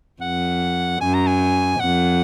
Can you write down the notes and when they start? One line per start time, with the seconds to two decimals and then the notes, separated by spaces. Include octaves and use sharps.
0.21 F2 F#5
1.01 F#2 G#5
1.14 A#5
1.27 G#5
1.80 F2 F#5